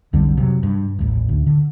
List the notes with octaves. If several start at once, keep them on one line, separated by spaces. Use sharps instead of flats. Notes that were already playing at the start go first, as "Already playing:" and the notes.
B1 F2 D3 G3
C3 F#3
G2
D#1 A1
D2
D3